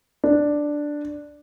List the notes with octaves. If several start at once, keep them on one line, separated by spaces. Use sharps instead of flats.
D4